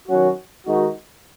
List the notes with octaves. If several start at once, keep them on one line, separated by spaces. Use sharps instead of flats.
D#3 F#3 C#4 F#4
D#3 G#3 D#4 F#4